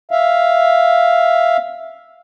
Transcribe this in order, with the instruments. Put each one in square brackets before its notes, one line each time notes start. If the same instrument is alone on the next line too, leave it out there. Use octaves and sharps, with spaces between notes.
[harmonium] E5 F5